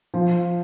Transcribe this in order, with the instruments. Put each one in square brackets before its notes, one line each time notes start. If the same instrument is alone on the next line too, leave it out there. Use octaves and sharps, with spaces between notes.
[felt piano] F3